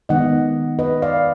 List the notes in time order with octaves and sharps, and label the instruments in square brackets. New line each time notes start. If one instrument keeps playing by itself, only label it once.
[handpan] D#3 G#3 B3 D#4 D#5 F#5
B4 D#5
D5 F5